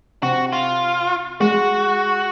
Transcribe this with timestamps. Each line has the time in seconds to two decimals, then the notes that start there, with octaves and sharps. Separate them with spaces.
0.22 C3 C4 F#4
0.53 F4
1.40 G#3 F#4